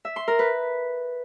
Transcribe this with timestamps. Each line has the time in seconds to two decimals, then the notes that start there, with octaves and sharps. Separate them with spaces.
0.05 E5
0.16 C6
0.28 A#4
0.39 B4